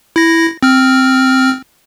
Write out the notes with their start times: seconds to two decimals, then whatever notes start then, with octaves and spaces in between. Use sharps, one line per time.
0.16 E4 A#6
0.63 C4 F6